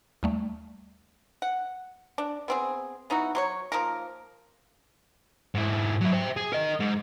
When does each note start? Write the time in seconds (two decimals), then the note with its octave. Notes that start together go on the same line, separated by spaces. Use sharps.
0.23 D#2 G3 A3
1.42 F#5
2.18 D4
2.48 B3 C4 G#4
3.10 B3 D#4 E4 F#4
3.35 F#3 C5 C#5
3.72 F3 A#3 D#4 A#4
5.55 G#2 E4
6.01 F#3 E4
6.13 C5 E5
6.37 G#4
6.53 A#4 D#5
6.80 G#2